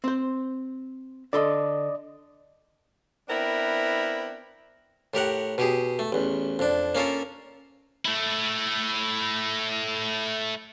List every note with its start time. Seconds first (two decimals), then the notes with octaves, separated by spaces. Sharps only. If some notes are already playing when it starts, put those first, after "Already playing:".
0.04 C4 C5
1.33 D3 A4 D5 D#5 C6
3.29 B3 C4 D4 E4 A#4
5.14 A2 G4 A#4 F#5
5.58 B2 G4 G#4
5.99 A3
6.12 A1 E2
6.59 F2 D4
6.95 A#3 C#4 F4 A4 A#4
8.05 A3 E4